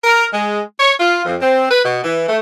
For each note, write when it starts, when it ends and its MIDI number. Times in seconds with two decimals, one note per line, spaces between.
0.04 0.26 70
0.32 0.61 56
0.79 0.93 73
0.99 1.25 65
1.25 1.35 41
1.41 1.68 60
1.70 1.83 71
1.85 2.01 47
2.03 2.27 52
2.29 2.38 57